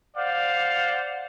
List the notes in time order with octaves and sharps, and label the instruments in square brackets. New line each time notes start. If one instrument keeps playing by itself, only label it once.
[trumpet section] C5 D5 F5 F#5